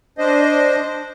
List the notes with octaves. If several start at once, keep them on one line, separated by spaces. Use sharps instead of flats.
D4 C5 D#5